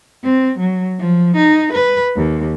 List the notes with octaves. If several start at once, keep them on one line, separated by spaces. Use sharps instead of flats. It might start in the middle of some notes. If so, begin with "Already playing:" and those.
C4
F#3
F3
D#4
B4
D#2